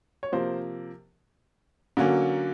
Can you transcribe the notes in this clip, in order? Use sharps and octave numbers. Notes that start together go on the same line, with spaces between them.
C#5
C3 F3 A#3 C5
D3 F#3 A#3 C#4